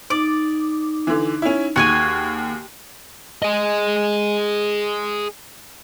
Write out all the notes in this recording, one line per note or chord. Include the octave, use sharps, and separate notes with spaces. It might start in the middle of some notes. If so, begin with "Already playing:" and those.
D#4 D5 D6
D3 E3
C#4 E4
D#2 F#4 G#4 G#5
G#4 D#5